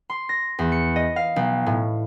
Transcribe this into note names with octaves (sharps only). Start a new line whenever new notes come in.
C6
A#6
E2
C#7
D#5
F5
B1
A2